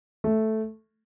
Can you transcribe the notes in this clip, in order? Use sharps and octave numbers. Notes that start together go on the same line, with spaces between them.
A3